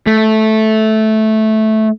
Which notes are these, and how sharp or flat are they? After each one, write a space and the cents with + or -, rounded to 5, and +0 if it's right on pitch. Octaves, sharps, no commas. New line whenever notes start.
A3 -10